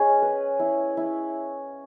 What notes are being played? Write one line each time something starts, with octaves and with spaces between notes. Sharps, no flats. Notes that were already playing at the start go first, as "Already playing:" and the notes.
Already playing: C#4 G#4 D#5
B4
E4
E4